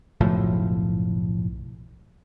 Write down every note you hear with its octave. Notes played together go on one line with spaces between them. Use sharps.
F#1 B1 A2 F3